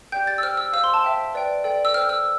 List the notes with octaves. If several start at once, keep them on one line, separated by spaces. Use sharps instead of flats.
G4 D5 G5 G6
A6
E6
C5 G5 F6
E6
C5 F5 E6
C6
A5
C5 E5 G5
B4 D5 G5
A4 D5 G5
E6
C5 G5 F6
E6